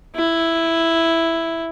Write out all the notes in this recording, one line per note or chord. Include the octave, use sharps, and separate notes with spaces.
E4